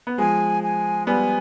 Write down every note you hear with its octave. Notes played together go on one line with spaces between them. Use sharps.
B3
F3 G#3 G#5
G#5
G3 B3 G#5